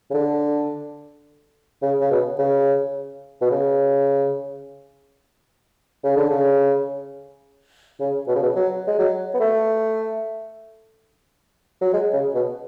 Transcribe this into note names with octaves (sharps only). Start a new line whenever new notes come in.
C#3
D3
C#3
C#3
B2
C#3
B2
C#3
C#3
D3
C#3
C#3
B2
C#3
B2
F#3
G#3
F#3
B3
A3
F#3
G#3
C#3
B2